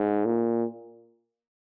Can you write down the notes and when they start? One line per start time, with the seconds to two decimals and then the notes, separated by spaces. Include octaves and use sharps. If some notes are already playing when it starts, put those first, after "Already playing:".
Already playing: G#2
0.25 A#2